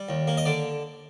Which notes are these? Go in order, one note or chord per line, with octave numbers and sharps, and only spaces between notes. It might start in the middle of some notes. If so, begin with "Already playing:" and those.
Already playing: G3
D#2
A#3
D#5
D3 D5